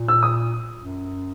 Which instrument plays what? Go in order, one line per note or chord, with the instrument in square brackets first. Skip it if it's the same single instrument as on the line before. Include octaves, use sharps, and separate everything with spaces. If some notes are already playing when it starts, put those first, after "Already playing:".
Already playing: [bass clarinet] A#2
[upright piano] E6
D#6
[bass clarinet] F#2